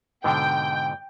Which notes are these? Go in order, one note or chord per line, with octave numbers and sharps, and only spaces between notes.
G#2 B2 D3 G5